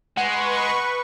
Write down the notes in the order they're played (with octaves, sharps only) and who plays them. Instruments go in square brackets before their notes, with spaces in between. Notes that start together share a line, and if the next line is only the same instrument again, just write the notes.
[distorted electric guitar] G#3 [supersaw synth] B4 C#6 [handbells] F#5